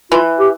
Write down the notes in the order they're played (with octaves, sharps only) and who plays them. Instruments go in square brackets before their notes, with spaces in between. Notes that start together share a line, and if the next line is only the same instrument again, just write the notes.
[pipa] E3 [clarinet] F4
[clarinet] G4